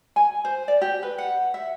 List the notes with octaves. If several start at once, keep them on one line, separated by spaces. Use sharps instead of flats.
G#5
C5
D5
G4
B4
F#5
E5